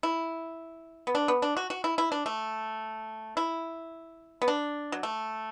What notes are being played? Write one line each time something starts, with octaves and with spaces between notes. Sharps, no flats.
E4
B3
D4
B3
D4
F#4
F#4
E4
E4
D4
A3
E4
B3
D4
F#3
A3